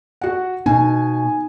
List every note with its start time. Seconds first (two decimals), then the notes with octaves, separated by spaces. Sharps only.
0.21 F#4 F#5
0.66 B2 D#4 G#5